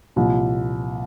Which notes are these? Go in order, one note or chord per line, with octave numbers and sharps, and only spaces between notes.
C2 A#2 F3